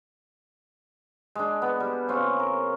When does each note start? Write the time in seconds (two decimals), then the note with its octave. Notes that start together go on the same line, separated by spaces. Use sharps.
1.35 G#3 D4
1.62 B3
1.80 G3
2.08 C#3 C4 F4 C#5
2.39 A#4